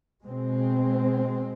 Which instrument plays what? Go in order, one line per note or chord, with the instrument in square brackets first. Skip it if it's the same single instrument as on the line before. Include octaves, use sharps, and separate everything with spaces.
[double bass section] B2 G#3 C4